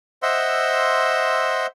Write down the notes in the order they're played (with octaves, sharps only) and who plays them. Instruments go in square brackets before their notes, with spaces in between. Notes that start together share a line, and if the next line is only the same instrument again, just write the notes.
[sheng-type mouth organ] C5 D#5 E5 F#5 C6 E6